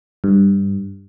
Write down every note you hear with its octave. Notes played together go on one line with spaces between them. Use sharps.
G2